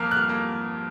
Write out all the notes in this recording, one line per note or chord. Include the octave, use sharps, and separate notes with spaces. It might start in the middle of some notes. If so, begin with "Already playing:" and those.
Already playing: F2 A#3 F6
F#6
F6
A#3